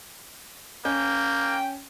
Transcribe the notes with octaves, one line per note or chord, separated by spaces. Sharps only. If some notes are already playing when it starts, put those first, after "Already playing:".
A#3 C#4 G5